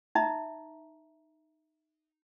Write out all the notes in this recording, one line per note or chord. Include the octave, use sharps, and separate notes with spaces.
D#4 E5 A#5